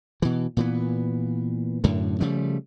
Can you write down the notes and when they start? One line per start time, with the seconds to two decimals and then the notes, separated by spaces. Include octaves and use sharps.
0.22 B2 E3
0.57 A#2 E3 B3
1.84 F#2 A2 D3
2.20 C#3 F3 G3 A3